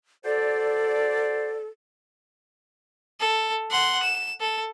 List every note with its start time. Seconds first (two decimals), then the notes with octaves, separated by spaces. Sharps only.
0.25 F#4 A4 C5 D5
3.20 A4
3.71 F#5 C6
4.04 E7
4.40 A4